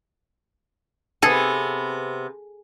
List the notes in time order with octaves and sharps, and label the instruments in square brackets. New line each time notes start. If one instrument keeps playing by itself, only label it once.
[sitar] C3 B3 [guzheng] G#4 A4